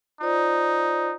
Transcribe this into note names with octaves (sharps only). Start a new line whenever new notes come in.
D#4 F4 C5 D5